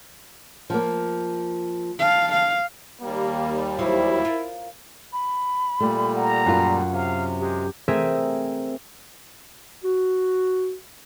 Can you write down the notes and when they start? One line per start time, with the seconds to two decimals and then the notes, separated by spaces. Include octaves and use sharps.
0.70 F3 A#3
2.00 F5 A5
2.33 F5
3.01 D#2 G3 A#3
3.79 E2 F#3 C4 E4
4.25 F4 A#4
5.13 B5
5.80 A#2 G3 A3
6.15 F#5 A#5
6.46 F#2 F4
6.91 C3 F5
7.40 G#3 G4
7.88 A3 C4 G#4 A#4 E5 G#5
9.84 F#4